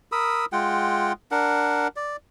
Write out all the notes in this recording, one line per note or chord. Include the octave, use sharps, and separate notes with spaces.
A#4 B5 D#6 E6
G#3 F4 F#5 G5
D4 A#4 F#5
D5